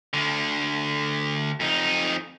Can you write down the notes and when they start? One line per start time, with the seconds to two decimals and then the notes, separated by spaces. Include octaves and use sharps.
0.13 D2 D3
1.60 F2 D#4